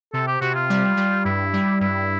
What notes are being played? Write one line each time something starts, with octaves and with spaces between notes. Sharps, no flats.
C3 A4
G4
C3 F#4
F4
G3
G3
G2 E4
G3
G2 E4